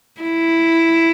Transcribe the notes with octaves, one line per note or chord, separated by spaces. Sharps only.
E4